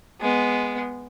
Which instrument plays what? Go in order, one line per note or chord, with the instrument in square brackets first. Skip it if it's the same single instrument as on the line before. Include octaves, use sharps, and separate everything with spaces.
[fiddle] G#3 B3